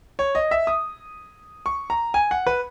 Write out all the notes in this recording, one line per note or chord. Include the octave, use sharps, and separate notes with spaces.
C#5
D#5
E5
D#6
C#6
A#5
G#5
F#5
B4